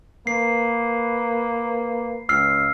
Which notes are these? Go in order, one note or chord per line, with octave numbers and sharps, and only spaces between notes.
A#3 B4 C7
C#2 E6 F6 C7